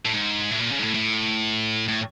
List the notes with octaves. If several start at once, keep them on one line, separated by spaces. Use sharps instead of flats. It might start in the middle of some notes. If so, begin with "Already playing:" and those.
A2
G#2
A2
A#2
C#3
G#2
A2
A2
A2